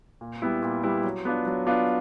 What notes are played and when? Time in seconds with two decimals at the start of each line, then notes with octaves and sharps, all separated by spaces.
0.21 A#2
0.42 G3 B3 E4
0.63 A#2
0.84 G3 B3 E4
1.04 F#3
1.25 B3 D4 F4
1.47 F#3
1.67 B3 D4 F4